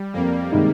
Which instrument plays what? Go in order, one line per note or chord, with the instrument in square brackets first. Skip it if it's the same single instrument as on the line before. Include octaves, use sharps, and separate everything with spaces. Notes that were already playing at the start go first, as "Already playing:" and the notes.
Already playing: [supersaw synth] G3
[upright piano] F2 [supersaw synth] A#3
[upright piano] C3 D#3 G#3 D#4